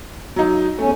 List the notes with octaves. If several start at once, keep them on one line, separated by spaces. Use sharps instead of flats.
F#3 D#4
E2 A3 C#4